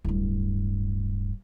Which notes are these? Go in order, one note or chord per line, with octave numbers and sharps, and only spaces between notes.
D1 G2